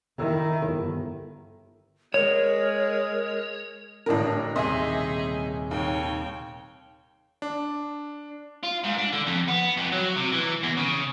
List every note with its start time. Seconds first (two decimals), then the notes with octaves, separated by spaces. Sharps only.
0.17 D#3 E4
0.67 G1
2.14 G#3 A#4 C#5
4.06 A1 A2 D3 D4 A#4
4.56 D#1 C3 D#4 G#4 D#5 E5 C6
5.71 D#2 C#5 G5
7.42 D4
8.63 F4
8.83 G#2
8.97 D4
9.12 D3
9.26 F2
9.48 B3
9.77 F2
9.92 F#3
10.16 C3
10.32 E3
10.63 E2
10.77 C#3